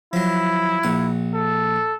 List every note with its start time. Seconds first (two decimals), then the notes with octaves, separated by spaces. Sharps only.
0.13 F3 F#3 E4
0.83 A#1 F#5
1.34 A4